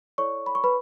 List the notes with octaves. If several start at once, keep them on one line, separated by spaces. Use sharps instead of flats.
E4 A4 C#5 D5 C#6
B5
C#6
B4 B5